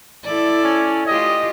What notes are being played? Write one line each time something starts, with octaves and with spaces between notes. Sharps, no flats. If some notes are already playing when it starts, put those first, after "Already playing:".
E4 A4 D5
C#4
F4 G4 D#5